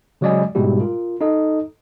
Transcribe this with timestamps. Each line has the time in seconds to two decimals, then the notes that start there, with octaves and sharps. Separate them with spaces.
0.21 C#3 F#3 G#3 D5 D#5 G#5
0.55 G#2 B2 G3 G#3 E4 G4
0.81 F4 A#4
1.21 D#4 A4 D#5